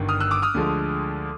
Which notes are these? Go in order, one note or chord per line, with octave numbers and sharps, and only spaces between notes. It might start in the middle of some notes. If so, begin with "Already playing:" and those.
Already playing: G1 G2 D#3
D#6 F6
E6 F#6
D6 E6
D#6 F6
D2 D3 F3 G#3